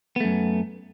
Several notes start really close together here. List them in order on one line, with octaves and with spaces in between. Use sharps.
B3 A3 F#2